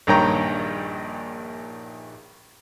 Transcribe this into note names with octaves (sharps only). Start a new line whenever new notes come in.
A#1 G2 D#3 C#5 G5 A#5